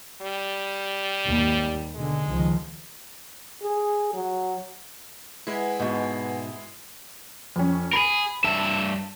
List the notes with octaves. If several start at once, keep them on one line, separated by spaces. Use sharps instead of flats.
G3
D#2 G#2
B2 D3 G#3
C#2 D#3 F3
G#4
F#3
G#3 E4 B4 F#5 G#5
G#2 B2
F2 C#4
G#4 A#4 B5
G2 E5 A5